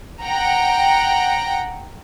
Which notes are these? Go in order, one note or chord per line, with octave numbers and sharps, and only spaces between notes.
F#5 G5 A#5